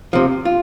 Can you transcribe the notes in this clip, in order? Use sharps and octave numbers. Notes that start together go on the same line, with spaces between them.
C3 F3
F4